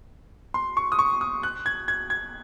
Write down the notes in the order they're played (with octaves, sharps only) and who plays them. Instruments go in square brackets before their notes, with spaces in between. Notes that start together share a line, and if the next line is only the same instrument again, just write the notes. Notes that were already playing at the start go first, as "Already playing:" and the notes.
[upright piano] C6
C#6
D#6
C#6
D#6
F#6
G#6
G#6
G#6